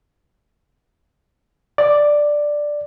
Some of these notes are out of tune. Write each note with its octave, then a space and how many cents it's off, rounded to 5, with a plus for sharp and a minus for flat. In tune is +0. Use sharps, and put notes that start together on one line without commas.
D5 +5